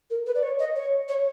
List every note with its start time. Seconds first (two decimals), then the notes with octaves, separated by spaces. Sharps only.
0.10 A#4
0.26 B4
0.35 D5
0.43 C#5
0.59 D#5
0.76 C#5
1.08 C#5